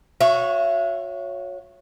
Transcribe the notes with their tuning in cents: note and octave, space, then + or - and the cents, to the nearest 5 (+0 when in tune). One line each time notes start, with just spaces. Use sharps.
F#4 -30 C#5 +0 E5 +30